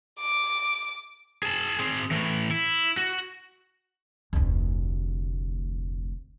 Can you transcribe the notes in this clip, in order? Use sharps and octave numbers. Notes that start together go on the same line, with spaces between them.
D6
G#4 A5
C4 G#4
A2 E3
E4
F#4
F1 D2